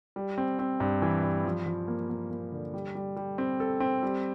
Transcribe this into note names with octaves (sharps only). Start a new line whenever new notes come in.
G3
C4
C4
G2
E3
G2
F3
F3
A#3
A#3
A#3
D3
G3
G3
G3
C4
A4
C4
G3